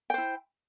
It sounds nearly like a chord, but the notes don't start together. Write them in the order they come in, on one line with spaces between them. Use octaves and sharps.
G5 C5 E4